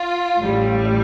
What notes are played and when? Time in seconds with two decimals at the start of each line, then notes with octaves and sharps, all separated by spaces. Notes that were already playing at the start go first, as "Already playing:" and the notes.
Already playing: F4
0.40 A1 A2 G3